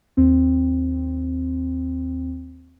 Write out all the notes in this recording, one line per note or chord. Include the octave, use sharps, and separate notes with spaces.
D#2 C4